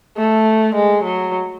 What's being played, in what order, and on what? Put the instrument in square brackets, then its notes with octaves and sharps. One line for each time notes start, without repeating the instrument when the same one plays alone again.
[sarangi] A3
G#3
F#3